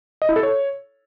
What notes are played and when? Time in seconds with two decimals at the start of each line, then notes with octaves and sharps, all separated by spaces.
0.22 D#5
0.29 E4
0.36 A4
0.43 C#5